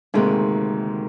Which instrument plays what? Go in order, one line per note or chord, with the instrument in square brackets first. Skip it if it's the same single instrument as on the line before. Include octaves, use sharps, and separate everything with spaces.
[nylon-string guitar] D2 C3 D#3 A#3 [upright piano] G#2 G#3